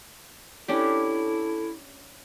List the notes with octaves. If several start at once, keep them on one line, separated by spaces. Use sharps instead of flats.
C#4 D4 E4 G4 A4